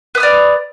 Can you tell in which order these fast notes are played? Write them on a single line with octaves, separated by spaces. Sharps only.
B4 D#6 F6 D5